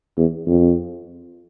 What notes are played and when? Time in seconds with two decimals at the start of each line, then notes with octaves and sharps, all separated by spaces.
0.17 E2
0.46 F2